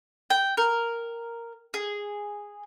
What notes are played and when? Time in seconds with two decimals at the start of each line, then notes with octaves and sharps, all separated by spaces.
0.30 G5
0.57 A#4
1.74 G#4